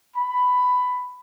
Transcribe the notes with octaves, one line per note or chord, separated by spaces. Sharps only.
B5